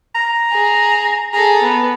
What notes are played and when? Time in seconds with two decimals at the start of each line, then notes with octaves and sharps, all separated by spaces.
0.15 A#5
0.51 G#4
1.33 G#4 A4 A#5
1.62 B3